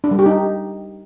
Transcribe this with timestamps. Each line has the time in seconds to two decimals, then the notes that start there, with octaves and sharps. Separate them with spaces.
0.04 D4
0.11 G3
0.19 G4
0.26 D#4